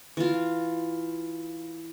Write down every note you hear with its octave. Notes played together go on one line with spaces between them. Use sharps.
E3 F4